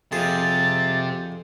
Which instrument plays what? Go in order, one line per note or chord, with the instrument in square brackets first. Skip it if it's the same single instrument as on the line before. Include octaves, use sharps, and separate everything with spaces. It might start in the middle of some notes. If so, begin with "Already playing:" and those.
[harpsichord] F2 G#4 [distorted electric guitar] C3 [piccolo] A6